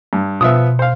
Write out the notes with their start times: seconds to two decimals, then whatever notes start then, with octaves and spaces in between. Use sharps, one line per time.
0.13 G2
0.41 B2 F3 B3 E5
0.79 C5 F5